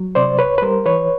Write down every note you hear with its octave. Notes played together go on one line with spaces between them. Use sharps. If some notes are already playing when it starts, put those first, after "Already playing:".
Already playing: F#3
C3 C5 D5
C2 B4 C#5
B4
G3 A#4 C5
E3 B4 C#5